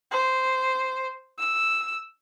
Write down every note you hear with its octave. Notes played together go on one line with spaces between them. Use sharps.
C5
E6